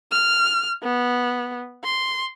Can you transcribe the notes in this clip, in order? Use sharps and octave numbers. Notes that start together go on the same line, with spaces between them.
F6
B3
C6